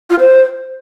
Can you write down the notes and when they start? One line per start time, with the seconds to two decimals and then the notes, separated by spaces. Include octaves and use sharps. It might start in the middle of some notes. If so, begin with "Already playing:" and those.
0.10 F4
0.20 C5